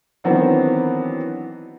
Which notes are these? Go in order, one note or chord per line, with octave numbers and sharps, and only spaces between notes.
D#3 E3 F#3 B3 C4 D4